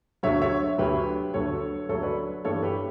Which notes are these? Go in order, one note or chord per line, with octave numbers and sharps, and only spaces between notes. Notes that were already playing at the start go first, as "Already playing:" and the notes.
D2 D3 F#3 C#5 E5
C#5 E5
D2 D3 F#3 G4 B4
D2 D3 F#3 A4 C#5
D2 D3 F#3 A4 C#5
B4 D5
G2 E3 G3 A4 C#5
G4 B4